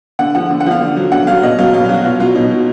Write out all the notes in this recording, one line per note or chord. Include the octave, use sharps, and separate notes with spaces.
D3 F#5
F3 F#5
D3
F#5
F3 F5
D3
F#3
D3 F#5
F#3 F5
B2 D#5
F#3 F5
B2 F5
F5
F#3 F#4
B2 F4
F#3 F4
B2 D#4
F#3